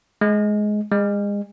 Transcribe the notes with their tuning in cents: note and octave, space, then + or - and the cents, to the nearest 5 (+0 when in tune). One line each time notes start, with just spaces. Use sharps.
G#3 +15
G#3 -35